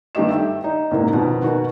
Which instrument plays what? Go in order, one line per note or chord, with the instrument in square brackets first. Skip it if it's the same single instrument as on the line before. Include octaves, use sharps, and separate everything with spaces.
[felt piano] G2 D#3 A3 G4 D#5 E7
E5 G5
D#4
A1 G#2 C3 A#3
F2 B2 D#3
B2 D#3 F#4 A#4